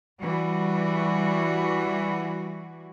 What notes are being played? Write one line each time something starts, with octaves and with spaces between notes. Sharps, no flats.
E3 G3 F#4